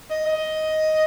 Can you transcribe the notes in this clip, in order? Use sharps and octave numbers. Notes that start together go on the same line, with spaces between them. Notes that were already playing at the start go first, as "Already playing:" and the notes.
D#5
D#5